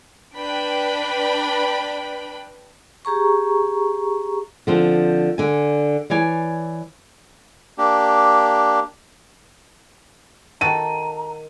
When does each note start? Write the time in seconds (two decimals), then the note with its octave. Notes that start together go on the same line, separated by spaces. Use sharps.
0.37 D4 B4 G5 B5
3.05 G4 G#4 A#5 C#6
4.67 D3 F3 C4
5.38 D3 G#5
6.10 E3 C#5 D5 G#5
7.78 A#3 D4 G4
10.61 D#3 F#4 A4 F#5 A#5 D#7